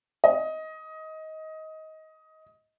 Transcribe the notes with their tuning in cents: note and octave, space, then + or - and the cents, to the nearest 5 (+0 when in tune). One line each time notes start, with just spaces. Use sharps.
D#5 +20